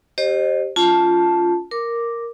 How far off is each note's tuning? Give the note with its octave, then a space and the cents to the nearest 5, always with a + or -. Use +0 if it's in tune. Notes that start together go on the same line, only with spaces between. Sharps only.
G4 +0 C5 +25 D#5 -25
C#4 +35 F4 +0 A5 +0
A#4 +0 D6 +0